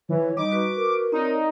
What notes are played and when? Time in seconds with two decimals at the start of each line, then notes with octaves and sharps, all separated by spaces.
0.09 E3 C#5
0.37 G3 D#4 D#5 B5 D6
0.52 F#4 B4 C#6
0.76 A#4
1.12 C4 D#4 C#5 D5
1.25 D5